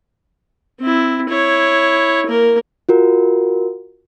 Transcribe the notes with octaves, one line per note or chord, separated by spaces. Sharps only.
C4 E4
E4 C#5
A#3 A#4
F4 F#4 A#4